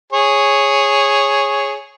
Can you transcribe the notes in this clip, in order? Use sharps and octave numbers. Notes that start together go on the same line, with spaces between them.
G#4 C#5